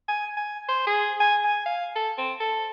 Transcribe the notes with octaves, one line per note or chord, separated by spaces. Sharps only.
G#5
G#5
C5
G#4
G#5
G#5
F5
A4
C4
A4